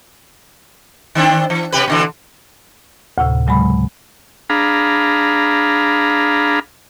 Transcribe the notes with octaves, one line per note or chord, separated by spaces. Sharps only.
D#3 C4 D4
E3
C3 G4 B4
B2 D3 E3
D2 A2 C3
C#3 F#3 G#3 B5
D4 G#4 F5 A#5 B5